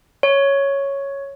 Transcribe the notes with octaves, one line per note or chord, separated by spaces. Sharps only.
C#5